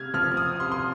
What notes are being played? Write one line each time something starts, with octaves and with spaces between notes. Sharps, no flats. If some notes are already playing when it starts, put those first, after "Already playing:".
Already playing: C3 F6 G#6
F3 F6
F6
D#6
C3 C6
C6